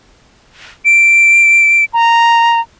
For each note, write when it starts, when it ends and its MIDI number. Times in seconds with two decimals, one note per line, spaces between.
0.85 1.85 98
1.94 2.60 82